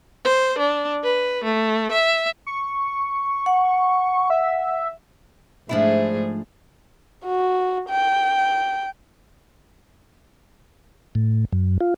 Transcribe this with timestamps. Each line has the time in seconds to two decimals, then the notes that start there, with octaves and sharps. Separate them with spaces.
0.25 C5
0.59 D4
1.03 B4
1.44 A3
1.92 E5
2.47 C#6
3.46 F#5
4.30 E5
5.69 G#2 F3 A3 D4 E4 G#4
7.26 F#4
7.89 G5
11.15 A2
11.52 F#2
11.81 F4